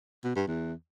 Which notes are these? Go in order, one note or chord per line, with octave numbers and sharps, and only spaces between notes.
B2
G2
E2